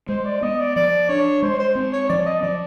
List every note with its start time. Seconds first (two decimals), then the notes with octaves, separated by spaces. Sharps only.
0.09 G#3 C5
0.26 D5
0.43 B3 D#5
0.59 D5
0.76 F3 D5
1.09 D4 C#5
1.42 G#3 C5
1.59 C5
1.75 C4
1.93 C#5
2.09 F3 D5
2.26 D#5
2.43 F3 D5